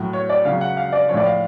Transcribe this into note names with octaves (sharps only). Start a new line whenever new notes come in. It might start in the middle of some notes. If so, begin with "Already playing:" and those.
Already playing: A2 F#3
C#5
D5
C#3 F#3 F5
F#5
F5
D5
F3 C#5
A2 D5
F5